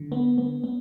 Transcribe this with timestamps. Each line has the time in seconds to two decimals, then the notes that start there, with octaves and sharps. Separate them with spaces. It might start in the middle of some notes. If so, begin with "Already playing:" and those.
Already playing: D3
0.12 B3
0.38 B3
0.64 B3